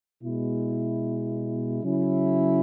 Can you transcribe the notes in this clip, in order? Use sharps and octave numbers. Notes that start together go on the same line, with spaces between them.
B2 G#3 E4
C#3 F#3 C#4 E4